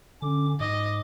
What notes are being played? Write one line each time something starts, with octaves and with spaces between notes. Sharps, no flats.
D3 C#4 D6
G#2 D#5 D6